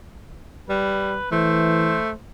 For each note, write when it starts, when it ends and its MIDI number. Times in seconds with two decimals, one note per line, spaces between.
0.69 1.17 55
0.69 1.31 71
1.32 1.98 52
1.32 2.12 57
1.32 2.14 72